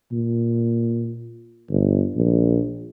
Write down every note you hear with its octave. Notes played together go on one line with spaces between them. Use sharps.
A#2
G1
A#1